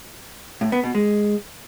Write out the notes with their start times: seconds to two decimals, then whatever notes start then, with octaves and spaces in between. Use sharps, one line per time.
0.61 A2
0.72 B3
0.83 B2
0.95 G#3